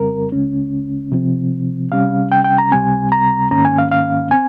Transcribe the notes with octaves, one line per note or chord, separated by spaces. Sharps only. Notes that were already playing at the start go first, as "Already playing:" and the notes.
Already playing: F2 C#3 G3 C4 A#4
C#2 C#3 G#3 C#4
C3 F3 C4
C3 G3 C#4 F5
G5
G5
A#5
C#2 C3 G3 C4 G#5
A#5
G#2 D#3 A#3 C#4 A#5
G#5
F5
F5
C4 G#5